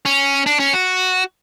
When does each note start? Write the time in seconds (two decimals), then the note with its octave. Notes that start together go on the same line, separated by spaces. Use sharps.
0.05 C#4
0.46 D4
0.60 C#4
0.73 F#4